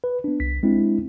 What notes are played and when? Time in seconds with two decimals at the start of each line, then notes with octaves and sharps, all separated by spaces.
0.04 B4
0.24 B3 D4
0.40 C2 B6
0.63 G#3 C4 D4 E4